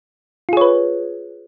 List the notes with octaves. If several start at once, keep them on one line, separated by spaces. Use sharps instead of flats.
F4 G#4 B4 C#5